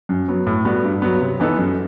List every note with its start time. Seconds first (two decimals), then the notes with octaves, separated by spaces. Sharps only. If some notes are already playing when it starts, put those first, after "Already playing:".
0.09 F#2
0.28 F#3 B3
0.47 A2
0.65 G3 B3 F#4
0.84 G2
1.02 F#3 B3
1.21 C3
1.40 E3 B3 D#4 A4
1.58 F#2